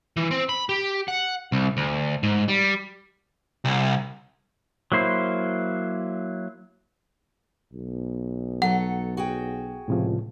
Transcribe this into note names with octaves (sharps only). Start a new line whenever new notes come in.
E3
C4
B5
G4
F#5
C2
D2
G#2
G3
C2
F#3 A#3 E4 C5
B1
F#3 A4 C#5 F#5
F#4 G#4 G5
C#2 A2 C3 F3